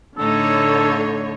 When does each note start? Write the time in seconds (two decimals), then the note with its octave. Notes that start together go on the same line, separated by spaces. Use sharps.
0.18 A2 D3 A3 D#4 A4 C#5